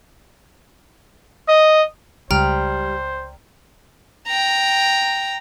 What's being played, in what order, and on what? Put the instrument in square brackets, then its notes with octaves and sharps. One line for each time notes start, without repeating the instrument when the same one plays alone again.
[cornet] D#5
[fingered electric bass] C#2 [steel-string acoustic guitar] G3 [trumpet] C5 [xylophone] G5 A#5 F6
[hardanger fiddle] G5 A#5